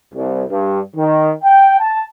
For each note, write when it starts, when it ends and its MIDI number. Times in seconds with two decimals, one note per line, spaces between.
0.14 0.44 36
0.49 0.79 43
0.96 1.31 51
1.43 1.76 79
1.79 2.02 81